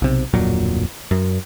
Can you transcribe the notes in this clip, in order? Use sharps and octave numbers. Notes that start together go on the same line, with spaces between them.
B1 C3
D1 F2 A#2 F#3
F#2